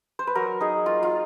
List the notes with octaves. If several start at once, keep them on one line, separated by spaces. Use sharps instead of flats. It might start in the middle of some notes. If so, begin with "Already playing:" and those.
C5
B4
F#3 A#4
D#4 G#4
A#3 F4
F4